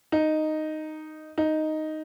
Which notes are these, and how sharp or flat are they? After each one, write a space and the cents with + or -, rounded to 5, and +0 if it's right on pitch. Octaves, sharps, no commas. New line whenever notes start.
D#4 -5
D#4 +0